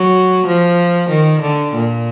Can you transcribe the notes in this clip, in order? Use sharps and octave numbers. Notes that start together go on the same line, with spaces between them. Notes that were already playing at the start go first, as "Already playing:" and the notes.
Already playing: F#3
F3
D#3
D3
A#2